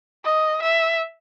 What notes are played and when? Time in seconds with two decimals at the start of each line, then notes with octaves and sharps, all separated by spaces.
0.24 D#5
0.62 E5